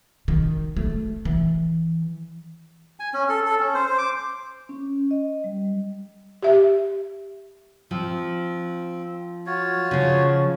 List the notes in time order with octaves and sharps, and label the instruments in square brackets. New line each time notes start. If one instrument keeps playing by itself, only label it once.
[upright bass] D#3
A3
E3
[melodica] G#5
C#4
A4
A4
C#4
C5
C5
D6
[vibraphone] C#4
D#5
G3
[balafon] G4 E5
[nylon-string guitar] F3 [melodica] C4
[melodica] F4 F#4 C#5
[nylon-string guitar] C#3 F3